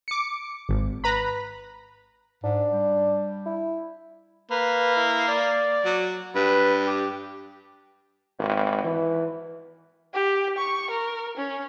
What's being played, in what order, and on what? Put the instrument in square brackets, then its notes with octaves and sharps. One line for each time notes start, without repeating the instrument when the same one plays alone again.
[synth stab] D6 C#7
G#1
B4 A#5 B5
[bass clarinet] G#2 [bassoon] D4
[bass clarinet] G3
[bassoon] E4
[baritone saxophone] A#3 [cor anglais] B4
[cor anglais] E4
D5
[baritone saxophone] F#3
[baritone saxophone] G2 [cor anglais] B4
[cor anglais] G4
[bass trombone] G#1
E3
[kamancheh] G4
C#6
A#4
C#4